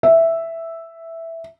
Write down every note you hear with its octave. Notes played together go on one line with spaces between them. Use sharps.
E5